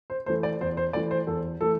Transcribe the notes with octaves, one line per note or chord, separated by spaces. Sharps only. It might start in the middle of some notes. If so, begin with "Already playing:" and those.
C5
E3 A3 C5
D5
E2 C5
C5
E3 A3 D5
C5
E2 A4
E3 A3 A4